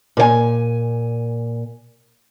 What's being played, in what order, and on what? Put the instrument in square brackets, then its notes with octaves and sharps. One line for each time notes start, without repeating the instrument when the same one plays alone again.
[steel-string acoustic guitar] A#2 C5 G#5